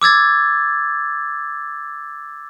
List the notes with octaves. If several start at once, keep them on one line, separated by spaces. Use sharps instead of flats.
D6 E6 G#6 A6